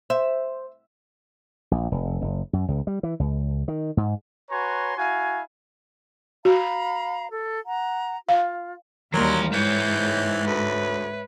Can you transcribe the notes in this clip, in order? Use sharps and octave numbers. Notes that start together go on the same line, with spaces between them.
C5 E5
A#1
F1
F#1
F#2
C#2
G3
E3
C#2
D#3
G#2
F#4 B4 C#5 G#5 A#5 C6
E4 F#4 F5 G#5
F#4 F5 A#5 B5
A4
F#5 A#5
F4 F5
D#2 E3 F#3 G3 A#4 C6
G#2 E3 C#5 E5 G6
D2 B4